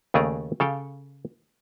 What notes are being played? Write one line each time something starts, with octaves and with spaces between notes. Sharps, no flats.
D#2 C#3 A3 G#4 D5 A#5
C#3 A4 F5 G5